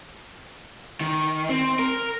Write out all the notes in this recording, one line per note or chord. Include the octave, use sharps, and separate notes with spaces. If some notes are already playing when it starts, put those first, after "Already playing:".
D#3
C4
A#4